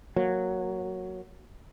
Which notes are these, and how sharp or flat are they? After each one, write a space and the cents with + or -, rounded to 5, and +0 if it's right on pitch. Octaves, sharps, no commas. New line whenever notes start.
F#3 +0 A#3 +0